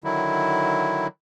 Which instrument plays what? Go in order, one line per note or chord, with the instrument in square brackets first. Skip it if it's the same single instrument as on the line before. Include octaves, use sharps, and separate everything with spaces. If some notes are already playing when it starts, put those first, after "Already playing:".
[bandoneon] D3 D#3 F#3 E4